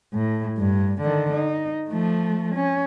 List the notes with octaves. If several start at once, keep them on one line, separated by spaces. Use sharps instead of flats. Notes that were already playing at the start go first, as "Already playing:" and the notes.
A2
G2
D3 D#3
D#4
F3 A3
C#4